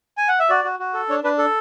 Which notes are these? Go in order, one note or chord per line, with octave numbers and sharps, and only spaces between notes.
G#5
F#5
E5
F#4 D5
F#4
F#4
A4
D4 C#5
D4 B4
A4